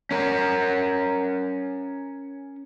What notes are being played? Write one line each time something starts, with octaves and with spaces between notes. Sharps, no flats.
C#4 A#4